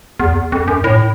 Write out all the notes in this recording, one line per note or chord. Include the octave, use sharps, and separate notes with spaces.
E2
F2
F#2
A2